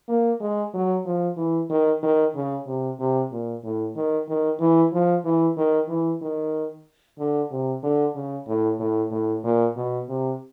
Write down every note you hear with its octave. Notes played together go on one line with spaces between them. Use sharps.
A#3
G#3
F#3
F3
E3
D#3
D#3
C#3
C3
C3
A#2
A2
D#3
D#3
E3
F3
E3
D#3
E3
D#3
D3
C3
D3
C#3
A2
A2
A2
A#2
B2
C3